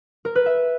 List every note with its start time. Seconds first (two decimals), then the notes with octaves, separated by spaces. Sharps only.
0.25 A#4
0.35 B4
0.46 E5